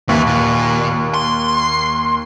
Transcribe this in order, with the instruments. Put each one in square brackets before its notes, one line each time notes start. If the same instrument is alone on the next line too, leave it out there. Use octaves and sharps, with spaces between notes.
[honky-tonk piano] D#2 [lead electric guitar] E3
[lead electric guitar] A#2
C6